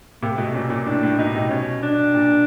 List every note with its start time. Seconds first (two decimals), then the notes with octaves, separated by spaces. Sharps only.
0.22 C3 A#3
0.29 A3
0.37 B2 G#3
0.44 A3
0.54 A#2 C#4
0.70 A#2
0.86 A2 D4
1.03 A2
1.18 B2 D#4
1.35 C3
1.50 B2 C#4
1.83 D4
2.14 A#2